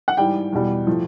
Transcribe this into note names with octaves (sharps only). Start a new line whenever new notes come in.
F#5
G#2 E3 G3 G5
E2 B2 G3
A2 F3